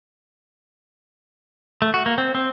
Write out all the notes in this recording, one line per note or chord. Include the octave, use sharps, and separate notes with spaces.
A3
F#4
A#3
C4
C4